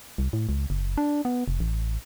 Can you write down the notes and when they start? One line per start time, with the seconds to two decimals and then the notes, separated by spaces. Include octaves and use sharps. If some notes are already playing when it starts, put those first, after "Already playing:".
0.18 C2
0.33 A2
0.49 C#2
0.70 F#1
0.97 D4
1.25 B3
1.48 F1
1.60 A1